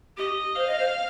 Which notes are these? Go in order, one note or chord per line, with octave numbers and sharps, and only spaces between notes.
G4 D#5
C5 F5
D#5
C5